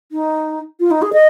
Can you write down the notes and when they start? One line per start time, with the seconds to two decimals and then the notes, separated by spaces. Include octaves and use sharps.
0.12 D#4
0.80 F4
0.91 D#4
1.02 G#4
1.13 D#5